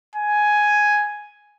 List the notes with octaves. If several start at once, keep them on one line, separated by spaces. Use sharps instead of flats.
G#5